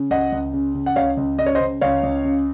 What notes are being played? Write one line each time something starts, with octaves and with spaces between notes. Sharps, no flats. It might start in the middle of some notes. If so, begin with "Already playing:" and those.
Already playing: C#3
C#2 D#5 F#5
C#2
C#3
C#3
F#5
C#2 C#5 F5
C#2
C#3 D#5
C#5
C5 D#5
C#3
C#2 C#5 F5
C#2
C#3